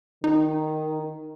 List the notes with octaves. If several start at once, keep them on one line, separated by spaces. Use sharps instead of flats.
D#3 D#4